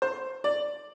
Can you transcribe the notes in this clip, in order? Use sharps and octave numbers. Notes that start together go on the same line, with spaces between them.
C5
D5